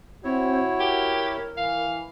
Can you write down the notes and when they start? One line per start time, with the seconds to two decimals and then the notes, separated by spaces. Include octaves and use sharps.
0.24 C4 E4 F#4 C#5
0.80 G4 A#4
1.57 E3 F5